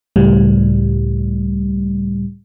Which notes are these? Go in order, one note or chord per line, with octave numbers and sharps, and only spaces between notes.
C#2 A2 G3